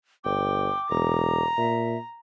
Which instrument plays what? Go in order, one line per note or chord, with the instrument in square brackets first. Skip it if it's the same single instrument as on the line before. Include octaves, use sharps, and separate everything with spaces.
[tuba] G1 [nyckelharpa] G5 [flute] D6
[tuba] E1 [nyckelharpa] A#5
[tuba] A#2 [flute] E5